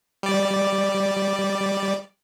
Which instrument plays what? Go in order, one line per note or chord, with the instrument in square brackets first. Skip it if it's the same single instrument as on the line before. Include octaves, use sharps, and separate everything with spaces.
[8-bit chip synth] G3 D5